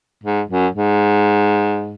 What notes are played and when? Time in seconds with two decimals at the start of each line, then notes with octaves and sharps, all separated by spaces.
0.24 G#2
0.50 F#2
0.75 G#2